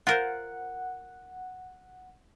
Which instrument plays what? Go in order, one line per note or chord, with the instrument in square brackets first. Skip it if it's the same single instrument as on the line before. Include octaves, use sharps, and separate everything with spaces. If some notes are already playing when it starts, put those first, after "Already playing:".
[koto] F4 A#4 C5 [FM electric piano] F#5